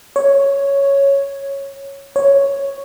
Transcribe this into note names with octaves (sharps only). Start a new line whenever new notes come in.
C#5
C#5